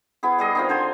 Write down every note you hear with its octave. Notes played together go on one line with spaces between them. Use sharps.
B3 E4 G#4
G3 G#4 D#5
D#3 C4 F4
D3 C5 G#5 C6